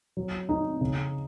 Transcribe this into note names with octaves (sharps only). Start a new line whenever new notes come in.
F#3
D#4
C#3